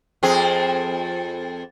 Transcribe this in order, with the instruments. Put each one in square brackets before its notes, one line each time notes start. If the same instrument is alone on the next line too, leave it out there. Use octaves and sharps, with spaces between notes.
[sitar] F2 C4 G#4